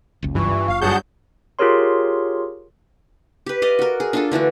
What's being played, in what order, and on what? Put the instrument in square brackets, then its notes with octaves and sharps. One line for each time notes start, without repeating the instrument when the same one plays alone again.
[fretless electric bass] F#1 C#2
[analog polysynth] G2 E3 [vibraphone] F4 C#6
[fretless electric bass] F#1 [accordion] F5
[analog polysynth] G2 F#3 G6 [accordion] G#4 F#5 A5
[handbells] F4 G4 G#4 A#4 C#5 C6
[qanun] G4 B4
D5 D#5 F5
F#4 A#4
G#4
D4 F4 A4
D3 E3 A3 F#4